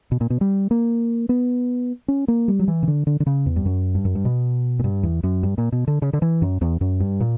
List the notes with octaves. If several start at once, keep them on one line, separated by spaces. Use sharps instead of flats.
B2
A#2
B2
G3
A#3
B3
C#4
A#3
G3
F#3
E3
C#3
D3
D3
D3
C#3
E2
G2
F#2
G2
F#2
G2
B2
A#2
G2
E2
F#2
G2
A#2
B2
D3
C#3
D3
E3
F#2
E2
F#2
G2
A#2